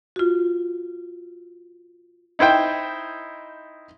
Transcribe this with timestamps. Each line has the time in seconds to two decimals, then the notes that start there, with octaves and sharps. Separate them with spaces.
0.16 F4 F#4
2.39 D#4 E4 C5 G5